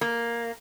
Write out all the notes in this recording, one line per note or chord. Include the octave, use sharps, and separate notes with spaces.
A#3